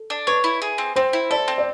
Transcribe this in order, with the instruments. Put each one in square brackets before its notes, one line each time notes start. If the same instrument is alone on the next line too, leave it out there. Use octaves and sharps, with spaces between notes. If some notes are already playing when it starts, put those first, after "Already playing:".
Already playing: [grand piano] A4
[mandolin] D4
[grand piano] B4 [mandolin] C#5
[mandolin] E4
G#4
C4
[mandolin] C4 [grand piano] C5
[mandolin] E4
[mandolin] A4 [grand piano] D5
[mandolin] C4
[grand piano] D5